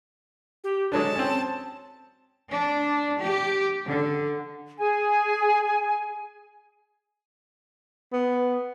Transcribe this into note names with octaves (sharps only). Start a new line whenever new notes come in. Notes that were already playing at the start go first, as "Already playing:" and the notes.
G4
D3 F#3 G#3 A5
C4 C#4
D4
G4
D3
G#4 G#5
B3